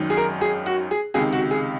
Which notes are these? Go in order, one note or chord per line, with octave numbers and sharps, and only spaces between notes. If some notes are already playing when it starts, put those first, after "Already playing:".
Already playing: G#1 F#2 D#3
G#4
A#4
G#4
F#4
G#4
C#2 C3 D#3 G#4
F#4
G#4